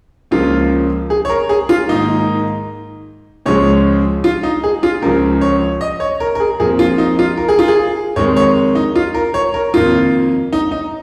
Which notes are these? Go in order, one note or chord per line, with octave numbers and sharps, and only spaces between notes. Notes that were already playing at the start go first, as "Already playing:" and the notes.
C#2 C#3 F3 A#3 F4
G#4
C#5
A#4
G#4
F4
G#2 D#3 A#3 D#4
C#2 C#3 F3 G#3 C#5
F4
D#4
G#4
F4
C#2 C#3 F3 A#4
C#5
D#5
C#5
A#4
A#4
G#4
F2 F3 A#3 G#4
F4
D#4
F4
A#4
G#4
F4
G#4
F2 D#3 G#3 C#5
C#5
D#4
F4
A#4
C#5
A#4
F2 D#3 A#3 F4
D#4
D#4